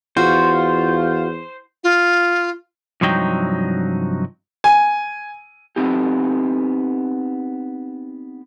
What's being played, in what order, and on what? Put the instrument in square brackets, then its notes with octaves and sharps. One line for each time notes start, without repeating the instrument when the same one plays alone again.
[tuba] E2 [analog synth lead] F4 [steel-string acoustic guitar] F#4 [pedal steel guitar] C5
[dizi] F4
[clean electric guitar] C2 G2 F3 F#3 D#4 G5
[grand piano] G#5
[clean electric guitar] B3 C4 D#4 G4